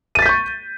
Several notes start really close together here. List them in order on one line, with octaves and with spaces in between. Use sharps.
D#7 A6 B6 G6 C#6